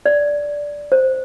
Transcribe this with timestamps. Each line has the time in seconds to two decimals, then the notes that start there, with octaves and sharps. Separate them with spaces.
0.06 D5
0.92 C5